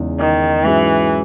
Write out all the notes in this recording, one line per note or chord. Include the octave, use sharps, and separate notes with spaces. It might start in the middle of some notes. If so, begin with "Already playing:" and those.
Already playing: E2 C#3 G#3 D#4 G#4
D#3
G#2 E3 F#3 C#4 E4 G#4